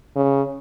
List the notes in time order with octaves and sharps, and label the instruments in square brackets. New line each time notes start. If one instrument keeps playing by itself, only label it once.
[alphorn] C#3